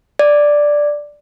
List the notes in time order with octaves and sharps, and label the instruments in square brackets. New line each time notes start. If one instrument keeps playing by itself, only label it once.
[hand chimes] D5